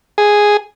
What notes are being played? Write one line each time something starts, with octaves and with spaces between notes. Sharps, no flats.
G#4